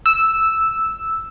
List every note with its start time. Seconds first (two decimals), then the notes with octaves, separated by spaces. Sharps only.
0.06 E6